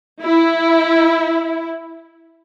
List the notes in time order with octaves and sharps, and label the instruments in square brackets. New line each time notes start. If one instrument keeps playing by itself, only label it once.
[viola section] E4